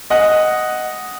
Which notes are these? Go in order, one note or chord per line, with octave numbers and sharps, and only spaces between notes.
D#5 F#5